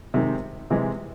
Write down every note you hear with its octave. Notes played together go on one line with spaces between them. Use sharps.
C3 D#3 G#3 C4
C3 E3 G#3